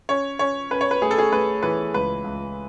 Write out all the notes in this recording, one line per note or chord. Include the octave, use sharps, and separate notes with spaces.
C#4 C#5
C#4 C#5
C#4 B4
C#5
B4
A3 G#4
A4
G#4
A3 B4
E3 B4
C#2 B4
C#2